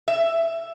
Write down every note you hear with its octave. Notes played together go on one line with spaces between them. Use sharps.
E5